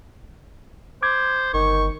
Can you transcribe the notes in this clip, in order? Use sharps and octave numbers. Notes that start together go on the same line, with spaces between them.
C5 D6 G#6
G1 D#3 C#6